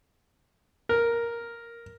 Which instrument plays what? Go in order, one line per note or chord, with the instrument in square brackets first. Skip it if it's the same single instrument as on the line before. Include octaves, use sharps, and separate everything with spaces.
[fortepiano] A#4